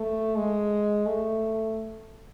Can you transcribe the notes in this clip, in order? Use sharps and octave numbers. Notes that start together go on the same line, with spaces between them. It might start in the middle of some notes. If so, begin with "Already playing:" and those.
Already playing: A3
G#3
A3